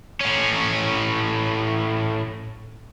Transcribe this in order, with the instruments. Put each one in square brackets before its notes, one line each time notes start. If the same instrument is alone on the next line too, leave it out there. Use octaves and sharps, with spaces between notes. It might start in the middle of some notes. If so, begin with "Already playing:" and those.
[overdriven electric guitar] A2 C#4